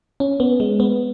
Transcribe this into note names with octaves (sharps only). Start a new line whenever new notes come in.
C#4
B3
G#3
B3